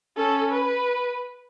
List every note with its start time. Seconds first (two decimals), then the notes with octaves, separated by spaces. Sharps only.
0.17 C#4 A4
0.52 B4